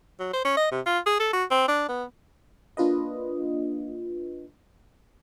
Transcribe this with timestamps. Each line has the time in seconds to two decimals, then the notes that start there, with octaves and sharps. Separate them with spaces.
0.20 F#3
0.33 C5
0.45 C#4
0.57 D#5
0.72 C3
0.86 F4
1.06 G#4
1.20 A4
1.33 F#4
1.51 C4
1.68 D4
1.89 B3
2.77 A#3 D4 F4 B4 D#5